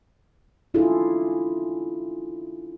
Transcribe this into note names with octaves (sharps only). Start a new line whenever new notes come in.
C#4 D4 E4 F4 G#4 A4